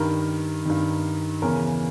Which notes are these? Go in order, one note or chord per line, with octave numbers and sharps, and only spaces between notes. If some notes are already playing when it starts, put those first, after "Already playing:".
Already playing: G2 D#3 A#4
G2 D#3
E2 C#3 E3 A#4